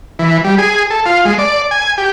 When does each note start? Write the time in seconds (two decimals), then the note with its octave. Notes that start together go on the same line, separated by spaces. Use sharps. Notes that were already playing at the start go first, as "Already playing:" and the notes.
0.19 E3
0.44 G3
0.58 G#4
0.90 A4
1.06 F4
1.25 G#3
1.39 D5
1.71 G#5
1.98 G4